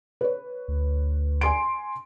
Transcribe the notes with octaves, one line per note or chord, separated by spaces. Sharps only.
B4 C#5
D2
G#5 C6 D7